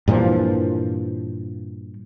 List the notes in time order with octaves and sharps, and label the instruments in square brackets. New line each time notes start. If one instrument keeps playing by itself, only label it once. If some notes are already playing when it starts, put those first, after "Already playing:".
[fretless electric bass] G2 A#2 E3 F3